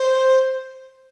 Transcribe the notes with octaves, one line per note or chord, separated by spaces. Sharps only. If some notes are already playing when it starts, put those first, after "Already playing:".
Already playing: C5